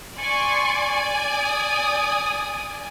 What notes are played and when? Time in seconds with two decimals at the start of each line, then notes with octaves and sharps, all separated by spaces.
0.18 D5 G#5 C6 C#6
1.31 D#6